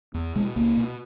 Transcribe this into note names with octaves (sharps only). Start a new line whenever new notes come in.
E2
B2 G#3
C#2 A#3
B2